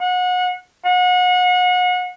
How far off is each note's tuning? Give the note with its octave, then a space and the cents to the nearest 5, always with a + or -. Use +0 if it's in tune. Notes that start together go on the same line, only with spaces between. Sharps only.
F#5 -30
F#5 -35